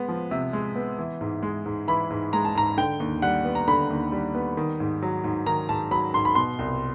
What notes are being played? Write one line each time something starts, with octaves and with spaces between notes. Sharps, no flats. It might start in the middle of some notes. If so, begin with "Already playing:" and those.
Already playing: G#3 B3
F3
C3
G#3
B3
E3
G#2
G#3
G#2
E3 B5
G#2
G#3 A#5
A5
G#2 A#5
D3 G5
D#2
G3 F#5
B3
A#5
D3 B5
D#2
G3
B3
D#3
G#2
F#3
G#2
D#3 A#5
G#2 A5
F#3 B5
G#2 C6
B5
B2 C6
C2